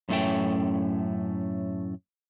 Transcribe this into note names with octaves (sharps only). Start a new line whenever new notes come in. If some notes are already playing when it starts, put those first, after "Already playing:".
F#2 A2 G#3 A3 C#4 G5